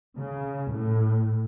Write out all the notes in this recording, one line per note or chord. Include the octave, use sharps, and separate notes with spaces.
C#3
A2